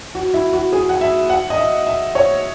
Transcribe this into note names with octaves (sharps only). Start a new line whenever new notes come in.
F#4
E4
F#4
G#4
F#5
E5
F#5
D#5
E5
E5
C#5